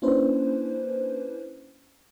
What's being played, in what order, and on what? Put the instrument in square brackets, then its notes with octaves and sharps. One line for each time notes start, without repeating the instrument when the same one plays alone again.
[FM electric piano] A#3 C#4 D4 E4 B4 C5